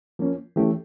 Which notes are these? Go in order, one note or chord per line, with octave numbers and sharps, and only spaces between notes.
F3 A#3 C#4
E3 A3 C#4 G4